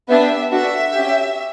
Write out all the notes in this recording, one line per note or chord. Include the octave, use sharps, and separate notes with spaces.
B3 D4 G4 E5
D4 F#4 A4 E5
C#4 G4